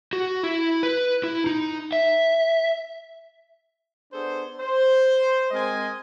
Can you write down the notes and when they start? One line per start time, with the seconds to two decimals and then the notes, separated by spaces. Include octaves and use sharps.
0.13 F#4
0.44 E4
0.83 B4
1.24 E4
1.47 D#4
1.92 E5
4.12 B3 D4 G#4 A4 C5
4.59 C5
5.51 G#3 C4 A#4 C5 D#5 G#5